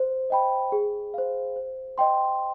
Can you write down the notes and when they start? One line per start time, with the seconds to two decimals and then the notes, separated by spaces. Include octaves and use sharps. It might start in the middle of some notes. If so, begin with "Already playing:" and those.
Already playing: C5
0.30 D#5 G5 B5
0.72 G#4
1.14 C5 F5
1.56 C5
1.98 D#5 G5 C6